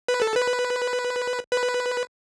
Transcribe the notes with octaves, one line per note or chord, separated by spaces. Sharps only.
B4
A4
B4
B4